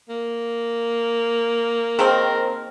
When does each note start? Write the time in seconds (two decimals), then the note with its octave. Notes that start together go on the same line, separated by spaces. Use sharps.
0.09 A#3
1.99 D#3 F3 C4 G#4 A#4 C5